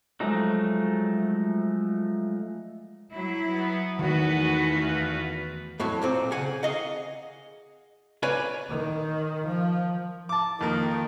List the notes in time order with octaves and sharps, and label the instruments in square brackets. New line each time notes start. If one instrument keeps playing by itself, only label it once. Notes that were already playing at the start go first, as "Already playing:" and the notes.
[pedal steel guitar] F3 F#3 G#3 A3 D#4
[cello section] F#3 E4
[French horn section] B3
[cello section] E2 A3 F#4 [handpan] D#3 [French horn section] G#3 B3 B4
[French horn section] F#2 F4 B4
[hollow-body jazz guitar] F2 A2 F#3
B1 A#2 C4
C#3 F5 F#5 G#5
G#4 D#5 F5 F#5
B4 C#5 D5 F5 G#5 B5
[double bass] D#3
F3
[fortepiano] A5 D6
[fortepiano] F2 A#3 [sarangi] D#3